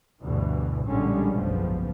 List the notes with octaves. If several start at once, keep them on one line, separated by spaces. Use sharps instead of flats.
D2 G2 B2 E3
A#1 A2 D3 G3 G#3 C#4
F#1 B1 G#2 F3 B3